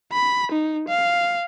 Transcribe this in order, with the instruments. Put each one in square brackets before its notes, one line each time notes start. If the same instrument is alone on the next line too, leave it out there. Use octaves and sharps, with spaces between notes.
[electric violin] B5
D#4
F5